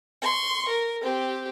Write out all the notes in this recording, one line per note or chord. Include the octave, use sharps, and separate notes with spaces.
C6 C#6
A#4
C4 G4